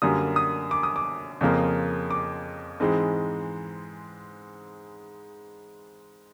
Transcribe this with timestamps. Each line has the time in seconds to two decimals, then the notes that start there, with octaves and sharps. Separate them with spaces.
0.02 F#2 D3 G3 A#3 D#6
0.36 D#6
0.71 D6
0.83 D#6
0.96 D6
1.41 F2 C#3 F3 A#3
2.11 D6
2.80 G#2 E3 G#3 C4